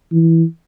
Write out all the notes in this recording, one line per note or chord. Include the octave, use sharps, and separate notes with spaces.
E3